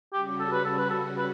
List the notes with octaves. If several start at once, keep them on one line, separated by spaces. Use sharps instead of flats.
C#3 G3 C#4 F#4 G4
A4
B4
A4
B4
A4
B4